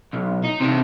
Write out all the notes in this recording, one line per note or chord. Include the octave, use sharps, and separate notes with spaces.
B1
D#4
C3 D4